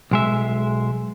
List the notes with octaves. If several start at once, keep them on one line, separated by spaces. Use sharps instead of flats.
B1 G#3 E5